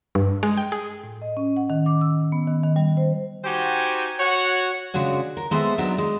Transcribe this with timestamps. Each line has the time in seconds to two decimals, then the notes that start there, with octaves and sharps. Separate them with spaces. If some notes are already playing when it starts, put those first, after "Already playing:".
0.15 G2
0.43 G#3
0.57 G5
0.72 G#4
1.04 A2
1.22 D#5
1.37 C#4
1.57 F#5
1.70 D#3
1.86 D6
2.01 E6
2.32 B3
2.47 D#3
2.63 D#3
2.76 G3
2.97 C5
3.45 D#4 F#4 G4 C5 G5 G#5
4.19 F#4 C#5 F#5
4.94 C#3 G#3 D4 F#4 C#5
5.37 A#4
5.51 G#3 B3 A4 C5 D#5 E5
5.78 F#3 B3 D4 D#4
5.98 G#3